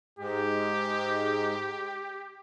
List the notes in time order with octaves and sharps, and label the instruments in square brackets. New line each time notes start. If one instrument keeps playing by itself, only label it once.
[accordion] G#2 G#3 [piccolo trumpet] G4